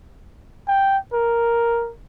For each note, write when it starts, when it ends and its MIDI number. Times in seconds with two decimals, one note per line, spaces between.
0.68 0.97 79
1.13 1.91 70